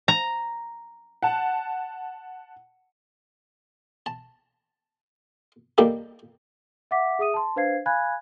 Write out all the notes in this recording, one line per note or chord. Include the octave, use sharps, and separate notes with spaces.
A#5
F#5 A5
A5
D#3 G3 A#3 G4 A4
E5 F#5 D6 B6
G#4 E5 D#6 D#7
A5 C6
D4 B4 C5 F5 G#6 C7
F5 G#5 B5 F#6 G#6